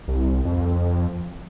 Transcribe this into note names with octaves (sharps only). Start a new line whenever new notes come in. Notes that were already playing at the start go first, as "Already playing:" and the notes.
C2
F2